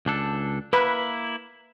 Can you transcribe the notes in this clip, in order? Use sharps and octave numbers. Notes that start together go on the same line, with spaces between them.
C#2 D4 A4
A#3 E4 B4